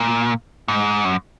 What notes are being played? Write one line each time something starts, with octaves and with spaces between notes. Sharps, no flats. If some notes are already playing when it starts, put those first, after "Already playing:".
Already playing: A#2
G#2
F#2